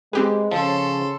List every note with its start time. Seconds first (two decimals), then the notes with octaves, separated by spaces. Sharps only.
0.13 G#3 C4 G4 G#4 B4
0.52 C#3 F3 A4 C6